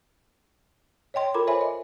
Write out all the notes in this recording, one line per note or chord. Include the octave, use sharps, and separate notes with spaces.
C#5 D#5 G5 C6
F4 A4 A#4 A#5 B5 D6
C5 C#5 E5 G#5 B5 C6
D#5